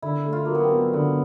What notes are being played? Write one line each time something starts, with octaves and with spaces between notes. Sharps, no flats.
D3 E4
A3
F4
F#3 A#3
B3
C4
F#3
D3 B3